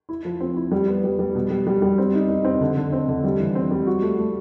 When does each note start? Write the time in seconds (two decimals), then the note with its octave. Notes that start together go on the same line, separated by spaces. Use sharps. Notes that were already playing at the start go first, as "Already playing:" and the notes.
0.09 E4
0.25 F3
0.40 C4
0.56 E4
0.72 G3
0.88 B3
1.04 G3
1.19 G3
1.35 B2
1.50 G3
1.67 G3
1.82 G3
1.98 C4
2.14 D#4
2.29 D#4
2.45 C4
2.61 D3
2.77 D3
2.93 C4
3.08 D3
3.24 G3
3.39 E3
3.55 C4
3.71 G3
3.87 F#4
4.02 A3
4.19 A3